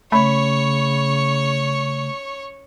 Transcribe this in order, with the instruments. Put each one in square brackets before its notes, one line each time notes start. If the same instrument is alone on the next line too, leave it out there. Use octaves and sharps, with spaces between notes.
[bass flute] C#3 [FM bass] A3 [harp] C#4 B5 [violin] C#5 C#6